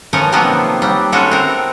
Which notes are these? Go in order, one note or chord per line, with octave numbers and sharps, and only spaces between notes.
E3 F3 A3 C#4 D#4 A#4
C3 D#3 F3 F#3 A#3 B3
F#3 G3
G#3 C#4 E4 F#4 A4
C4 A#4